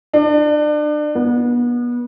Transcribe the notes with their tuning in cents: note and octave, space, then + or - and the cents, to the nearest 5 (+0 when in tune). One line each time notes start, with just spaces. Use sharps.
D4 +30
B3 -30